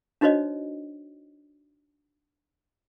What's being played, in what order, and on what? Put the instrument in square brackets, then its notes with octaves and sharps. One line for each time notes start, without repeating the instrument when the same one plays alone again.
[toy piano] D4 D#4 F#4 C5 C#5 D#5